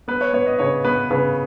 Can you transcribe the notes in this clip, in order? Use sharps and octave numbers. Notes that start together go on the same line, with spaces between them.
B3 B4
C#5
B3 C#5
D#5
C#3 C#5
B3 B4
C#3 B4